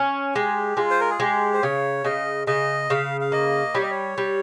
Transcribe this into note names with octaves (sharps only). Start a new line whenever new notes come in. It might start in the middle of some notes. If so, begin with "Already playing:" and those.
Already playing: C#4
G#3 G4
G#3 F4
C5
A#4
G#4
G#3 G4
C5
C#3 C#5
C#3 D#5
C#3 D#5
C#3 F5
F5
A#3 D#5
G3 C#5
D#5
C#5
G3